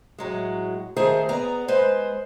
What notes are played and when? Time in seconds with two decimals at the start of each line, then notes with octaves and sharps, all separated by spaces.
0.18 A2 F#3 G#3
0.96 D#3 A3 G#4 C5
1.29 B3 G#4 D5 A#5
1.68 G#3 B4 C5